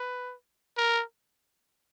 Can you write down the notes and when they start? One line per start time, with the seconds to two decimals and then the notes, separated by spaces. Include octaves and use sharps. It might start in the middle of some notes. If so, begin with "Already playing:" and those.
Already playing: B4
0.77 A#4